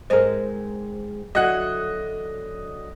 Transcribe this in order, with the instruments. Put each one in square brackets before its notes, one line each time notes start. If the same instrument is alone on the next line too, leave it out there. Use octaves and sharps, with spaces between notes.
[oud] G#2 G#3 C4 [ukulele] A#4 D#5 [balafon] C5
[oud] D3 F#3 [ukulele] E4 F#4 F#5 [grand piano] D#5 F#6